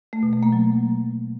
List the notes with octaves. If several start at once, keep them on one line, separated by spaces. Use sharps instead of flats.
A3
B2
A3
A#3
F#3